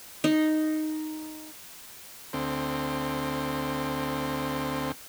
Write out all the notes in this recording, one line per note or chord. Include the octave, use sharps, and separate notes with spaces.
D#4
D2 C4